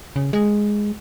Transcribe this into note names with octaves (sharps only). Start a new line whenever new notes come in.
C#3
G#3